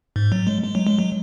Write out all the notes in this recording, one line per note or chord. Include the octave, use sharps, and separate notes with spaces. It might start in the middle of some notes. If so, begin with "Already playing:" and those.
G#2
F#3
G#3
G#3
F#3
G#3
F#3